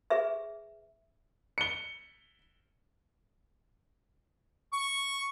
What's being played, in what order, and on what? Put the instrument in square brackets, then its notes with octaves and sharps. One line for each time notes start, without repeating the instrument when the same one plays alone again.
[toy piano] G#4 B4 E5
[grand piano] C#7 G7
[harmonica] C#6